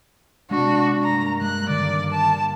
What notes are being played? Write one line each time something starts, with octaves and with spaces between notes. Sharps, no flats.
C3 G#3 D4 F#4
G2 A#3 A#5
G#3 F#6
D3 D#3 D5
A5